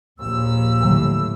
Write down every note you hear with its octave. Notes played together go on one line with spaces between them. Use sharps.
A#1 D#2 E6
A2 D3 F#3 G3